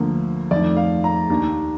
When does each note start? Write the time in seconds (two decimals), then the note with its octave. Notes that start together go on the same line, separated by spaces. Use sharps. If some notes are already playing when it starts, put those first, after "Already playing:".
Already playing: D2 D3 F3 A#3
0.51 F2 D#3 A3 D5
0.77 F5
1.04 A#5
1.29 D#2 D#3 A#3 D4